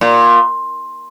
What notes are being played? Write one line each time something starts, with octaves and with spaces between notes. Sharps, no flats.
A#2